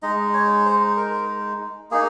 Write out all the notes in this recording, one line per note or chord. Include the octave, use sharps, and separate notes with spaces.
G#3 D#4 D#5
C#5
C5
A#4
A#3 D#4 G#4